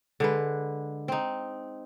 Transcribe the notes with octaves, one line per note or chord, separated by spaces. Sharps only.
D3 G#3 B4
C4 D#4